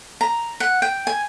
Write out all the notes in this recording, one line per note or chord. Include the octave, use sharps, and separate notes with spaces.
A#5
F#5
G5
G#5